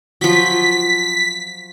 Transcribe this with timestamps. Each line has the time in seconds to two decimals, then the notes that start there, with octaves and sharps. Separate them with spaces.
0.21 F3 F#3 B6